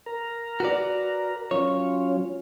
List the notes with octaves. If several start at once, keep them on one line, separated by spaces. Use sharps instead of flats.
A#4 A#5
F#4 B4 D5
F#3 C#4 F4 C#5